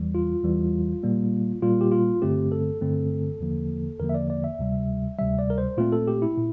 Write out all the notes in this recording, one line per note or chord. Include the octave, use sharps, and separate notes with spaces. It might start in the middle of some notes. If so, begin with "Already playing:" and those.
Already playing: E2 E3 G3
F4
E2 E3 G3
A#2 G3 A#3
A#2 G3 A#3 F4
G4
F4
G2 D3 A3 C4 G4
A4
G2 D3 A3 C4
E2 D3 F3 A#3
E2 D3 F3 A#3 A#4
E5
D5
D5
E5
D2 C3 G3
D2 C3 G3 E5
D5
A#4
C5
A#2 A3 C4 F4
A4
G4
E4
A#2